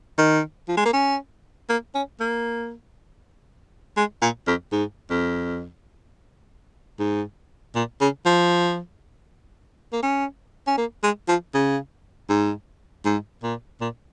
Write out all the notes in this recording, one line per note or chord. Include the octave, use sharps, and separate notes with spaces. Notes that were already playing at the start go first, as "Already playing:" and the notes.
D#3
F3
G#3
A#3
C#4
A#3
C#4
A#3
G#3
A#2
F2
G#2
F2
G#2
A#2
C#3
F3
A#3
C#4
C#4
A#3
G#3
F3
C#3
G#2
G#2
A#2
A#2